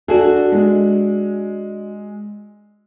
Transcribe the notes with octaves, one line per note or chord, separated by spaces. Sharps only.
D4 F#4 G#4 A4
G#3